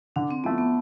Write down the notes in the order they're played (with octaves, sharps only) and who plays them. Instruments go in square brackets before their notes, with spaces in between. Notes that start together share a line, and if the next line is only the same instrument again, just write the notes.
[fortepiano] D3 [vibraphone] D4
[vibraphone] C4
[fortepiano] F3 A3 E4 [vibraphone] B3
[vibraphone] B3